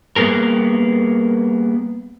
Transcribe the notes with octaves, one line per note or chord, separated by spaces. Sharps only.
G3 A#3 B3 G#4 A#4